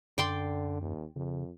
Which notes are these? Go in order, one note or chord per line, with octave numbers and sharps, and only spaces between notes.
F#2 D3 D5 G5 C6
D#2
F2 C#3